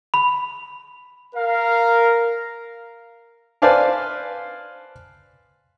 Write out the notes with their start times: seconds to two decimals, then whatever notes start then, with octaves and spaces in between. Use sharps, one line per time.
0.14 B5
1.35 A#4 F5
3.62 B4 C5 D5 F5 G#5 A5